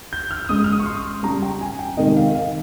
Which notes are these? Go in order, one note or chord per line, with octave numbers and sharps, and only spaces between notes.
G6
F6
F6
C#3 G#3 D#6
F6
D#6
C#6
C6
C#3 G3 A#5
G5
G#5
G5
C3 D#3 G#3 D#5
F5
F5